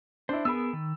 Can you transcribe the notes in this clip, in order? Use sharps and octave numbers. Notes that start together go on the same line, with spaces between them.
D4 E4 C5
B3 G#4 A#4 B5 E6
D#3